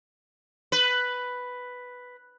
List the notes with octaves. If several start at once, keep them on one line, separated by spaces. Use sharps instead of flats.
B4